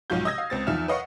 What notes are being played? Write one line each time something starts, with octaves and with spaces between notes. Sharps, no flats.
B1 G#2 F3 F4 F#4 G6
D#5 D#6 E6 G#6 A#6
F5
C#2 C4 A6
E2 D#3 F3 E5 F6 E7
B4 C#5 D#5 F5 F#5 C#6